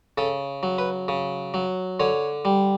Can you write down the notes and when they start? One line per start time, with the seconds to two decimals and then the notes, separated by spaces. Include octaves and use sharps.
0.18 C#3 A4
0.63 F#3
0.78 B4
1.08 C#3
1.54 F#3
2.00 D3 C#5
2.45 G3